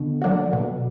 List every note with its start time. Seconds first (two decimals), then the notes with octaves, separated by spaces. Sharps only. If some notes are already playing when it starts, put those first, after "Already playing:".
Already playing: B2 D3
0.22 F#3 A#3 D4 F#4
0.53 B2